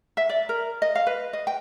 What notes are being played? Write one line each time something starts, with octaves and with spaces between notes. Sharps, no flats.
E5
D5
A#4
D#5
F5
B4
D#5
G5